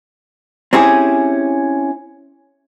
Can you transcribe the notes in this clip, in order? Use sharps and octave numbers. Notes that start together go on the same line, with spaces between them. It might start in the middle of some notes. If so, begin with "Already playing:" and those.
C4 C#4 E4 G4 G#4